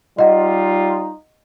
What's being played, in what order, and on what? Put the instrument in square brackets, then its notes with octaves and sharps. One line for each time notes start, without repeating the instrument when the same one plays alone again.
[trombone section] G3 D#4 F4 [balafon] D#5 F#5